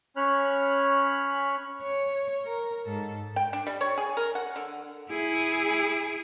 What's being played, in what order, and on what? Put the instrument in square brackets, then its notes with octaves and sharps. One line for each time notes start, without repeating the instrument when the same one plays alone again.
[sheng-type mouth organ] C#4 C#5 B5 F6 F#6
[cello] C#5
A#4
G#2 A4
[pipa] G5
D4
G3
C#5
G#4
A#4
F#5
D3
[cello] E4 G#4